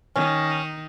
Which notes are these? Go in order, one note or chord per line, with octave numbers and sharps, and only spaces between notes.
D#3 C#4 D#4